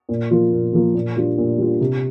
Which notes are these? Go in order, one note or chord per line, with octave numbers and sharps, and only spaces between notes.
A#2
F3 A#3 F4
A#2
F3 A#3 F4
A#2
G3 D4 F4
A#2
G3 D4 F4
C3